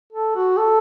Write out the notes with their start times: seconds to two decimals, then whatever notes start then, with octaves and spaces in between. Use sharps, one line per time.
0.13 A4
0.35 F#4
0.57 A4